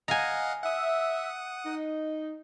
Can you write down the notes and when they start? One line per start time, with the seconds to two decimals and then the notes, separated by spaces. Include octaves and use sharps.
0.08 D#5 F5 F#5 G#5 A#5
0.64 E5 F#5 D#6
1.65 D#4